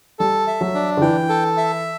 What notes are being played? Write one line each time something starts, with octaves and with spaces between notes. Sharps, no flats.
G3 A4
E5
F#3
D4
D3
E3 G5
A4
E5